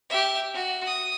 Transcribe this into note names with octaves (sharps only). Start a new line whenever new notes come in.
G4 E5
F#4
D#6